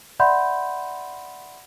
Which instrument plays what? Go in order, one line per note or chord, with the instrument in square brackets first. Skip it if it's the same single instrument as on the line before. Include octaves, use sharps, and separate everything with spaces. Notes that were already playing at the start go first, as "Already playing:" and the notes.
[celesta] D5 E5 F#5 B5 C6 G6